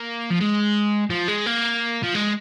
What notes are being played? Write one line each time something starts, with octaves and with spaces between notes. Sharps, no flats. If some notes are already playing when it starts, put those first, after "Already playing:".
Already playing: A#3
F3
G#3
F3
G#3
A#3
F3
G#3